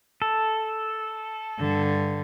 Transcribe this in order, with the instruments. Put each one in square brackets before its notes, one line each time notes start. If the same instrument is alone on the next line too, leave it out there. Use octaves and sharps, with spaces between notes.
[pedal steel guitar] A4
[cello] G2 D3